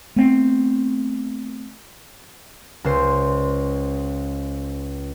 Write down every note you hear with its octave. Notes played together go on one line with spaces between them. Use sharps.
A3 B3 C4
C#2 C5